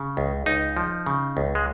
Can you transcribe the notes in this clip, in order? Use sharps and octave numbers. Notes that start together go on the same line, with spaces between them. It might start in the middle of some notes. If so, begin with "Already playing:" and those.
Already playing: C#3
C#2
C#2 D#4
F3
C#3
C#2
G#3